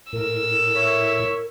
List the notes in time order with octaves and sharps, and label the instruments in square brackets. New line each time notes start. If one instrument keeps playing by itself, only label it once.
[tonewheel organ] A2 [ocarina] A#4 [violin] E6
[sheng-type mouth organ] E4 C#5 E5